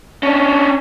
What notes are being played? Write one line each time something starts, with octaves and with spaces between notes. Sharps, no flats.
C#4 D4